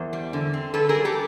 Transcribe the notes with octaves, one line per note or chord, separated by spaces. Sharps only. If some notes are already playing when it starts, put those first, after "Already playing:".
Already playing: E2 A#4 C5
G3
D3
C4
D3 A4 B4
G#4 A#4
G3
G4 A4